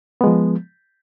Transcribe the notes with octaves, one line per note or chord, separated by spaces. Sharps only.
F3 G#3 B3